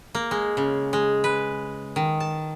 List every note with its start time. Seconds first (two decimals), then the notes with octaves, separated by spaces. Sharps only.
0.15 A#3
0.31 G#3
0.57 C#3
0.93 G#3
1.24 B4
1.96 D#3
2.20 A5